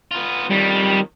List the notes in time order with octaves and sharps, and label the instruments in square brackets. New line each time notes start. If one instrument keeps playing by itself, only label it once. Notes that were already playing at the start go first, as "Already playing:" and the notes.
[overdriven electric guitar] B3 F4
[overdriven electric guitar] F2 D#3 [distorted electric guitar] G3